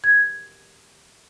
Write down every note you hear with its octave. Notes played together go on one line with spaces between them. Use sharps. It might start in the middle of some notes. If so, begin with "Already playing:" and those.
G#6